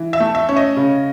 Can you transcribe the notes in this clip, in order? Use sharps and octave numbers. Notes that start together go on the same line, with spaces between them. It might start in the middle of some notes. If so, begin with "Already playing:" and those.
Already playing: E3
E5
A3
E5
C#4
D#5
C#3